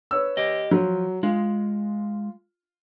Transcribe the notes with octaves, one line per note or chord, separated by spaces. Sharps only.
B4 C#5 E6
G4 D#5
F3 F#3
G#3 F4